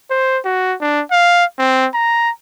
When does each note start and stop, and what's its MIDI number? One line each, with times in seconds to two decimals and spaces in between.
0.11 0.39 72
0.45 0.75 66
0.81 1.02 62
1.11 1.45 77
1.59 1.87 60
1.94 2.30 82